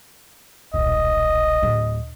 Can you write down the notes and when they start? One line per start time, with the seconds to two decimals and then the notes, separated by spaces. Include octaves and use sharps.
0.74 D#1 B1 D#5
1.62 D1